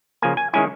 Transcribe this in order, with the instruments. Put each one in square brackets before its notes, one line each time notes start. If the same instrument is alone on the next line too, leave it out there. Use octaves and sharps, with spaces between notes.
[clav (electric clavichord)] C#3 F3 A#3 G#5
G#5
D#3 G#3 C#4 E4 G#5